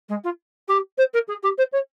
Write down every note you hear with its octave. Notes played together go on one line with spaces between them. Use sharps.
G#3
F4
G4
C5
A#4
G#4
G4
C5
C#5